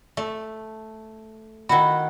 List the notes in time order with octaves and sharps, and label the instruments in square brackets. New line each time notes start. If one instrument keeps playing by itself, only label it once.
[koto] A3
[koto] D#3 E4 F#4 [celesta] B5